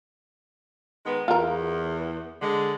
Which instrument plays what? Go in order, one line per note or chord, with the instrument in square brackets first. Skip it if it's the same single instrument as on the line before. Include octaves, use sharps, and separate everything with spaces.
[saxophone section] D#3 G#3 B3
[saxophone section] E2 [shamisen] F4 A#4
[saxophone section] D3 G#3